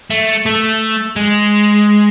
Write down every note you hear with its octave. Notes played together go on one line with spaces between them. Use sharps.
A3
A3
G#3